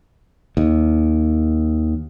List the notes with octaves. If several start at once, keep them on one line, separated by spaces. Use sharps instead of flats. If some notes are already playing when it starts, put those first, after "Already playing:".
D#2